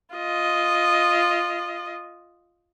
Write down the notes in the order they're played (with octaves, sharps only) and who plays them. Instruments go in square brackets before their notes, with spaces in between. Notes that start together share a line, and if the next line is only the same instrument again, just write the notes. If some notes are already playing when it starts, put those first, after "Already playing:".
[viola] F4 D#5